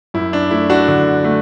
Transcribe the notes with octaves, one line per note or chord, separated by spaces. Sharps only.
F#2 E4
D4
A3 E4
D4 F#4
D3
A3